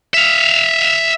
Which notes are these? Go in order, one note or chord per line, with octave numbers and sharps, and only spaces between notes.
E5 F5